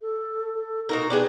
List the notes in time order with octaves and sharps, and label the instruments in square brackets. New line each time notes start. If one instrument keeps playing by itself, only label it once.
[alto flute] A4
A4
[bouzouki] A#2 F#4 A#4 [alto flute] D#4
[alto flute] B3 [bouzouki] D4 G4 G#4